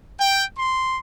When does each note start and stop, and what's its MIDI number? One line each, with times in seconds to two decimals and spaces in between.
0.20 0.43 79
0.58 0.98 84